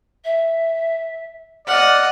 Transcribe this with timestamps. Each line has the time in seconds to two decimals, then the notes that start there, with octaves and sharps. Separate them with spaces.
0.24 E5
1.67 D5 D#5 F#5 F6